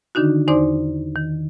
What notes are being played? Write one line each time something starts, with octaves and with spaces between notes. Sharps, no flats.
D3 D#3 D4 D#4 F#4
E2 D#4 C5 D5 C6 D6
D#3